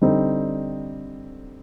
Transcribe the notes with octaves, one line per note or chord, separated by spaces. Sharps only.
D3 G3 C4 D#4